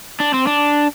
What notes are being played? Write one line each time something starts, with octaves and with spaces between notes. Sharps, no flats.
D4
C4
D4